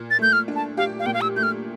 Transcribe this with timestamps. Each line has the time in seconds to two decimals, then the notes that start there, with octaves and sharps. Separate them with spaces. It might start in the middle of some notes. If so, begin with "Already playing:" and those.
Already playing: A#2
0.11 A6
0.19 A3 G6
0.33 F6
0.48 D4
0.55 A5
0.77 G4 F5
0.99 F5
1.06 A#2 G5
1.14 F5
1.21 E6
1.36 A3 G6
1.43 F6